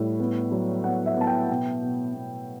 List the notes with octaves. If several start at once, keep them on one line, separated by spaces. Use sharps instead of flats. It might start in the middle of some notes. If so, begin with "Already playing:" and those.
Already playing: A2 G3
B3
F#3
B3 F#5
E5
B3 A5
G5
B2 G5
B2
B2